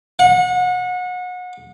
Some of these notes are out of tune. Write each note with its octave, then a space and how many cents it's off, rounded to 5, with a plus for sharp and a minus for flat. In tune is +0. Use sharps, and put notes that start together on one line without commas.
F#5 -30